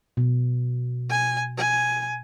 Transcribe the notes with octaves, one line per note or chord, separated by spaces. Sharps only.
B2
G#5
G#5